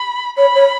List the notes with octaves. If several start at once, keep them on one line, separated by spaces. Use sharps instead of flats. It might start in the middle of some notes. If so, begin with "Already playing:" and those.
Already playing: B5
C#5 B5
C#5